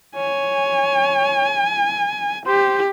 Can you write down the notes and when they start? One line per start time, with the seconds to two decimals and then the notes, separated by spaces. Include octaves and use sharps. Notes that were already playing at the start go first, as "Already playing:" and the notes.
0.16 C#5 G#5
2.46 G4 C5